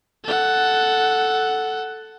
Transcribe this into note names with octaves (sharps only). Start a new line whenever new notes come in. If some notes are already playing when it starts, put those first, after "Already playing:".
A4 F#5